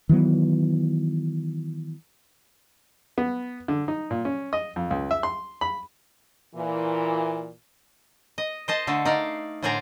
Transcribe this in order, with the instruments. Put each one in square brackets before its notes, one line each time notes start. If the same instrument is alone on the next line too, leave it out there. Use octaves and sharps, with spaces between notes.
[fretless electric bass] D#3 E3 F#3 B3
[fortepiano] B3
D3
D#4
A#2
C#4
D#5
F2
C#2
E5
C6
B5
[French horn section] A#2 E3
[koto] D#5
C5 D#5 A5
D3 A3 A4
D#4 D5 F5
A2 D3 C5 D5 G#5 A#5